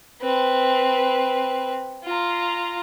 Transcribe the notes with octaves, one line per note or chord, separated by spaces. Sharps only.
C4 B4
F4 A#5